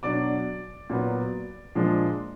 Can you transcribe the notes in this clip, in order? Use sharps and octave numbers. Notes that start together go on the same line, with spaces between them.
B2 F#3 D4 D5 D6
A#2 F#3 B3
A#2 F3 G#3 D4